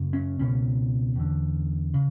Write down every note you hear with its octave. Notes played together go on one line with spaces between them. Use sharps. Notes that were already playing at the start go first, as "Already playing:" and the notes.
Already playing: F#2 C#3
C#4
C#2 B2 C#4
E2 D3
C#3